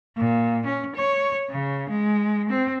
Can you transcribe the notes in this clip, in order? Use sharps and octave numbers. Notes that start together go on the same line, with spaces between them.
A#2
C#4
C#5
C#3
G#3
C4